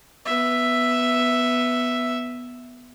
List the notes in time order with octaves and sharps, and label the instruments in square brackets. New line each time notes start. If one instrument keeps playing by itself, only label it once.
[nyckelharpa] B3 E5